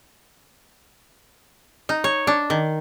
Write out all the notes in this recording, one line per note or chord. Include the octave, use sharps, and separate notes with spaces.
D#4
C#5
D4
D#3